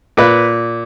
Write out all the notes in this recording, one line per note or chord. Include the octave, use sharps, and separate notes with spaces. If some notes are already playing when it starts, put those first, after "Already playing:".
A#2 B4